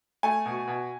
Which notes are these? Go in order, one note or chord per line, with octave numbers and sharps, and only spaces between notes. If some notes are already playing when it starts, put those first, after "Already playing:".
A3 G#5
B2
B2